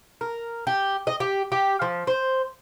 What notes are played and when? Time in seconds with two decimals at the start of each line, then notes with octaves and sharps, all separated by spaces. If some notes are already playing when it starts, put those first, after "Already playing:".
0.21 A#4
0.67 G4
1.07 D#5
1.20 G4
1.52 G4
1.82 F3
2.07 C5